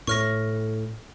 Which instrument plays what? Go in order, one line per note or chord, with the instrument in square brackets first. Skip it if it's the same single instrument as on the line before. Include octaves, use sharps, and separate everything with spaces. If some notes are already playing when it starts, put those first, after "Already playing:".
[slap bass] A2 [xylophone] C#6 F6 A#6